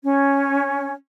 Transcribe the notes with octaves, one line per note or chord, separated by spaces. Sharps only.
C#4